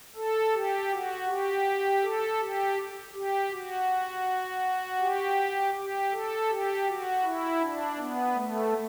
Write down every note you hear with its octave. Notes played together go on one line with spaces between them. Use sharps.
A4
G4
F#4
G4
A4
G4
G4
F#4
G4
G4
A4
G4
F#4
E4
D4
B3
A3